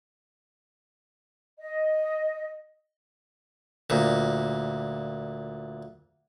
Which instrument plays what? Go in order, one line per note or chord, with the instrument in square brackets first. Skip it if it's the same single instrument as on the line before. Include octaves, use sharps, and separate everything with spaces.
[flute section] D#5
[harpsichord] D2 A#2